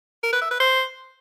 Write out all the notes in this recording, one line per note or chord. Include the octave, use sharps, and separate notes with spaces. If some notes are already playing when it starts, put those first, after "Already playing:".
A#4
B4
E5
B4
C5